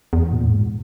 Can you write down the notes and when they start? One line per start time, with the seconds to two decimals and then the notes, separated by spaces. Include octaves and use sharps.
0.13 E2
0.32 A#2
0.47 G#2